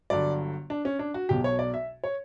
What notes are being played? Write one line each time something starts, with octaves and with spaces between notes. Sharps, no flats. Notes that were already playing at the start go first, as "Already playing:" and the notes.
G1 G2 D3 F#3 D5
D4
C#4
D4
F#4
B1 B2 F#3 G4
C#5
D5
E5
C#5